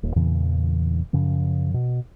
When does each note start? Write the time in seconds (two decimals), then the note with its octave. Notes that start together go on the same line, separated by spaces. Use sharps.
0.03 D#1 D#2
0.16 E2 A#2 C#3 E3
1.13 F#2 C#3 F3
1.74 B2